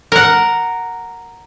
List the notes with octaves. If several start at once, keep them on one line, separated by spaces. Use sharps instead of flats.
A#4 F#5